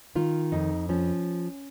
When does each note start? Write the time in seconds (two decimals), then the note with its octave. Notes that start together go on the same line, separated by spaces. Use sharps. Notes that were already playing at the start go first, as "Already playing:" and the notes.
0.15 D#3 F4
0.52 F2 D#4
0.89 F3 C#4